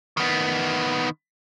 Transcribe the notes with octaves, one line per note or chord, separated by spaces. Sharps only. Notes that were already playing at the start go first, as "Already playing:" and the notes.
D#3 B3